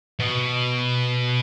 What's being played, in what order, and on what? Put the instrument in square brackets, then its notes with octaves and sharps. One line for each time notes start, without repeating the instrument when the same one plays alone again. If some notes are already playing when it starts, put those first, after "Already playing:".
[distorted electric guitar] B2